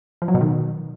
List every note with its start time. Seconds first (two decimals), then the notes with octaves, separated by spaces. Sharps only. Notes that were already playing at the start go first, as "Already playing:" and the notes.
0.22 F3
0.28 F#3
0.35 B2
0.41 D#3